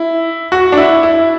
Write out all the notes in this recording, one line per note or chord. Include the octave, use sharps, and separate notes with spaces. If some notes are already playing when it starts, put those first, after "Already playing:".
Already playing: E4
F#4
D4
E4
E4